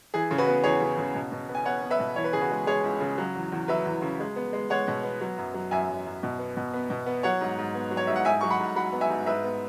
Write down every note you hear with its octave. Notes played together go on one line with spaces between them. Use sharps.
E3 G#4
C#3
F#4 B4
B3
E2 G#4 C#5
C#3
C#3
B2
B2
B3
G#5
B3 C#5 F#5
B3
B4 E5
B2
E3 C#5
B4
C#3 G#4
F#4 B4
G#3
G#3 G#4 C#5
C#2
C#3
F#3
E2
E2
F#3 B4 E5
E2
C#3
G#3
B3
G#3
G#3 C#5 F#5
B2
B3
F#3
F#2
F#3
F#2 E5 G#5
F#2
F#2
B2
B3
B2
B3
B2
B3
F#3 C#5 F#5
G#2
G#2
B3
F#3
C#5
G#2 E5
F#5
G#2 E5 G#5
F#3 C#6
F#5 B5
G#2
F#3 F#5 B5
B3
E5 G#5
G#2
G#2 B4 E5
B3